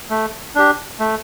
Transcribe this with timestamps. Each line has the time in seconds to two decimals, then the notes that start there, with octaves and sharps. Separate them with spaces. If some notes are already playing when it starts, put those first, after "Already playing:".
0.10 A3
0.55 D4 G4
1.00 A3